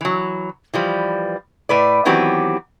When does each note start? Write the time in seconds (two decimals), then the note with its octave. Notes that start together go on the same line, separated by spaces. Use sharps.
0.01 E3 F#3
0.73 E3 F3 G3
1.69 A2 B4 D5
2.05 D#3 E3 F#3 B3 C4 G4